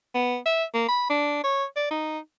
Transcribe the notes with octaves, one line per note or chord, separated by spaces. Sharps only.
B3
E5
A#3
B5
D4
C#5
D5
D#4